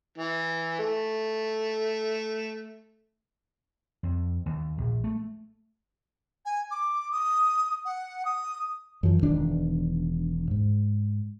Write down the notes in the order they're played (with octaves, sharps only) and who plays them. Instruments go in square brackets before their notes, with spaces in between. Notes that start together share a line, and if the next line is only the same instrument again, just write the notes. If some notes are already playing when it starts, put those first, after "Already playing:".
[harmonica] E3
A3
[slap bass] F2
D#2
A#1
A3
[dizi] G#5
D6
D#6
F#5
D#6
[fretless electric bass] F#2 E3 F3
E1 D#3 D4
G#2